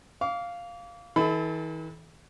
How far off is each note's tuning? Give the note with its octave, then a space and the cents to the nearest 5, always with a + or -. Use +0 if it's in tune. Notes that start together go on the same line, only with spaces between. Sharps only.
F5 +0 D6 -35
E3 -45 A4 -30 B5 +25